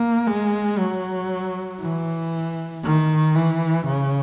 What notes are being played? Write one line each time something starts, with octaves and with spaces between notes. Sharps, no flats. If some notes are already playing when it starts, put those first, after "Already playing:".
Already playing: A#3
G#3
F#3
E3
D#3
E3
C#3